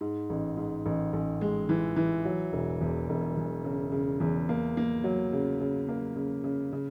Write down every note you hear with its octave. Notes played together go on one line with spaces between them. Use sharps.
G#2
A1
G#2
A1
A1
G#3
E3
E3
F#3
E1
E2
E1
E2
C#3
C#3
E2
A#3
A#3
F#3
C#3
C#3
A#3
C#3
C#3
C#3